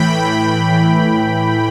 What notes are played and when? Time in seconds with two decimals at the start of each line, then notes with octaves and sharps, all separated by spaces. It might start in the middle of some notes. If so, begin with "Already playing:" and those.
Already playing: A2 E3 G5 B5
0.67 A2 E3